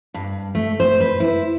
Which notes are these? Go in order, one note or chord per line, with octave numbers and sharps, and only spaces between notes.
G2
A3
C5
B4
E4